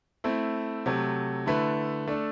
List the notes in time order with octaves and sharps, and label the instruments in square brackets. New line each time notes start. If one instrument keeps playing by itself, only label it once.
[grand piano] A3 C4 E4
C3 F#3 A3
D3 A3 E4 B4
A3 D4 A4